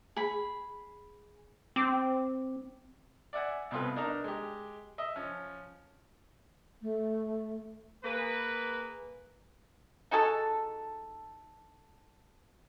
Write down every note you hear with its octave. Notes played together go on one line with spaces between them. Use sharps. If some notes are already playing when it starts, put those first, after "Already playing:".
G#4 B5
C4 D6
D5 E5 F#5 G#5
C2 B2 C4 F4 B4
D4 D#4 A#4 A#5
G#3 G4
D#5 E5
F3 C#4
A3
A#3 G#4 B4
D#4 F#4 G#4 A4